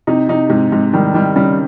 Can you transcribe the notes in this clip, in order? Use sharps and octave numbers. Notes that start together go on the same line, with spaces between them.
C3 D#4
C3 D#4
G#2 C3
G#2 C3
D#3 G3
D#3 G3
C#3 G3